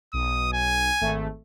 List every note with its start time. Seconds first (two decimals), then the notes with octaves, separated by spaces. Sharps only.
0.13 B1 D#6
0.53 G#5
1.01 G#1 A3